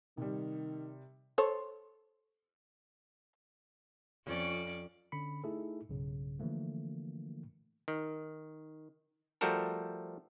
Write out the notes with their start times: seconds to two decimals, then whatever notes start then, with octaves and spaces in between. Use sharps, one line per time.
0.17 C3 D#3 G3
1.38 A4 C5 C#5
4.25 F2 C#4 D5
5.12 D3 C#4 B5 C#7
5.44 A3 D#4 E4 G#4 A4
5.89 B1 G2 C#3
6.39 D3 E3 F3 A3 A#3
7.88 D#3
9.41 F3 G3 A3 F#4 A4 A#4